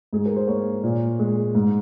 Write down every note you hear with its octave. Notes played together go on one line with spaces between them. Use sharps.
G#2 G#4
A#4
C5
A#3 C#5
A#2
G#3
G#2